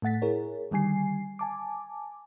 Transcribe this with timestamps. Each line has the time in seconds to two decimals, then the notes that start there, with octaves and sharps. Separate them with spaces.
0.02 A2 A3 F#5 A6 B6
0.22 E4 G#4 A#4 C#5
0.71 D3 D#3 G3 G#5 C7
1.39 G#5 A5 D6